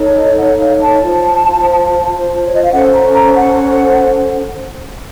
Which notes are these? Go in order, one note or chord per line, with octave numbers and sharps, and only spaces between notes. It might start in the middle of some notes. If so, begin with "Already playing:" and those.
Already playing: D#4 A4 C#5
D#5
F#5
F5
A5
F4 C5
C#5
D#5
F5
C#4 A4 C5 F#5
A#5
A#5
F#5